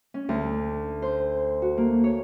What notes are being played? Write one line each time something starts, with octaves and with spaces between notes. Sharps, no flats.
C#4
D2
C5
F#4
A#3
C#5